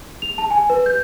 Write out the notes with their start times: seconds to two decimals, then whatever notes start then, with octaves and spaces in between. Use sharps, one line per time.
0.22 F7
0.38 A5
0.51 G#5
0.70 B4
0.86 G6